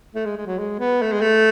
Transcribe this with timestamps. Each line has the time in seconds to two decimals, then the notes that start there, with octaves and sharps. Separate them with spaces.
0.15 A3
0.25 G#3
0.37 G#3
0.46 F#3
0.58 G#3
0.79 B3
1.02 A3
1.12 G#3
1.21 A3